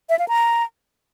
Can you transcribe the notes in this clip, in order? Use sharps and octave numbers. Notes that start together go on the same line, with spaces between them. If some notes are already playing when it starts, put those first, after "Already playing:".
E5
F5
A#5